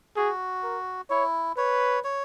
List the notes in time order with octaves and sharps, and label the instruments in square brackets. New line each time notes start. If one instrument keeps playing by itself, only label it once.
[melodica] F#4 [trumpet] G#4
[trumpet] A#4
[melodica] E4 [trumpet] C#5
[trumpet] B4 [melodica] C#5
[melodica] C#5